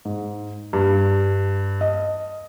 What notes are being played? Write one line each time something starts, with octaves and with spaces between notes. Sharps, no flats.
G#2
G2
D#5